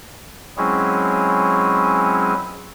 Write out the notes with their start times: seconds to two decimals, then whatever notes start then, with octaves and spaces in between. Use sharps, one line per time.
0.57 F#3 G#3 C4 C#4 E4 G#4